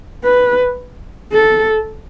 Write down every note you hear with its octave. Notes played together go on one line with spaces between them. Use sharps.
B4
A4